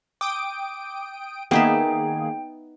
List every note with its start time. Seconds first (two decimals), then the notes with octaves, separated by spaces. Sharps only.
0.21 G5 D6 D#6 D7
1.51 D#3 A#3 B3 D#4 G#4 E5 G5